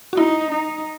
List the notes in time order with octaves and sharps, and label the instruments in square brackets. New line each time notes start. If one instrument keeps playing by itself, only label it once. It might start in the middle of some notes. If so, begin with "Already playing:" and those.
[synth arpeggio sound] F#4
[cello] D#4 [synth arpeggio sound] E4
[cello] D#4